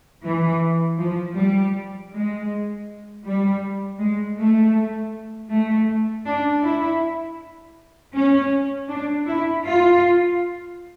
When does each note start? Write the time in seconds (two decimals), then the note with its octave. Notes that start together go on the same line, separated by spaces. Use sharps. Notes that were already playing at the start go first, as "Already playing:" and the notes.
0.23 E3
0.98 F3
1.36 G3
2.11 G#3
3.25 G3
3.99 G#3
4.37 A3
5.50 A3
6.26 D4
6.63 E4
8.13 C#4
8.89 D4
9.27 E4
9.64 F4